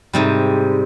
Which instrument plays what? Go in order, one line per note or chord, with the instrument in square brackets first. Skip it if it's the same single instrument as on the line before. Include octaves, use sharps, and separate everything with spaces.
[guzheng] G#2 C3 G3